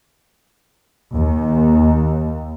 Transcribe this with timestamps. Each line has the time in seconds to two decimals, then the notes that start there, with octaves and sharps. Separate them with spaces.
1.13 D#2